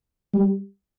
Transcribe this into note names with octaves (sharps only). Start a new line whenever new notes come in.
G3